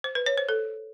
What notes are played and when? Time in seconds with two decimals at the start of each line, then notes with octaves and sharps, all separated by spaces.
0.04 C5
0.15 B4
0.26 C#5
0.37 C5
0.49 A4